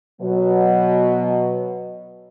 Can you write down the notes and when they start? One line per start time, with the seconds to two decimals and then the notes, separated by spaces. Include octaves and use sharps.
0.20 B2 F#3